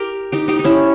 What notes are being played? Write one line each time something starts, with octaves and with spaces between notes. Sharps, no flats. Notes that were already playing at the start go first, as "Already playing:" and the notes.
Already playing: G4 A#4
D#4 G4
D#4 G4
D#4
C#4 E4